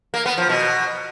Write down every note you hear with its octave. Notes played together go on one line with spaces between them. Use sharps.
A#3
B3
F3
B2